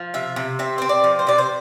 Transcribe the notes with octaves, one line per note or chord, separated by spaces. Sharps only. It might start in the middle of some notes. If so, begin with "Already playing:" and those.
Already playing: F3
C3 E5
C3
C4 E5
C4 C5
D5
F3
C5
C3 D5
C5